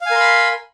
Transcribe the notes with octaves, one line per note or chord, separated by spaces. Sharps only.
A#4 F5 G#5 B5 C6